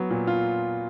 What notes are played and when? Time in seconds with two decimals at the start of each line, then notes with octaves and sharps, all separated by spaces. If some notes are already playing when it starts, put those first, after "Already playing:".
Already playing: F#3 B3
0.10 A#2
0.27 F4